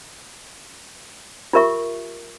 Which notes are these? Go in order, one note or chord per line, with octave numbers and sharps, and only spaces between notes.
F4 G4 A#4 E5 C#6